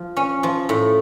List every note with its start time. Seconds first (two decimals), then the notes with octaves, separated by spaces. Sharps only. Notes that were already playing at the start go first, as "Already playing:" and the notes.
Already playing: F3
0.17 C#4
0.43 F3
0.69 A2